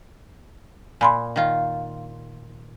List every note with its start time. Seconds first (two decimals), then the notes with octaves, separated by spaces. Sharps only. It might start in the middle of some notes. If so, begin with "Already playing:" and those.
1.01 A#2 G#5 B5 C6
1.36 D#3 F4